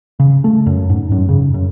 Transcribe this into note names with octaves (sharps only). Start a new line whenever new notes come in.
C#3
A3
F#2
G#2
F#2
C#3
F#2